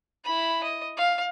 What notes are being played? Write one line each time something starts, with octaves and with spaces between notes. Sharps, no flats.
E4 B5
D#5
F5